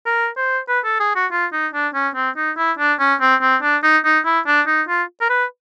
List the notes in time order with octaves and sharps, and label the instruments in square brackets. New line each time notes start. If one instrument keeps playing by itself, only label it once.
[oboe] A#4
C5
B4
A4
G#4
F#4
F4
D#4
D4
C#4
C4
D#4
E4
D4
C#4
C4
C4
D4
D#4
D#4
E4
D4
D#4
F4
A#4
B4